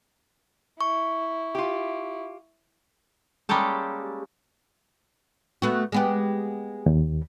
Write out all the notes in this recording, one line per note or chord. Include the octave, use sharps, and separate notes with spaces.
E4 C#6
F4 G4
G3 G#3 A#3 C#4 G4 A4
A3 B3 F#4
G#3 B3 G4
D#2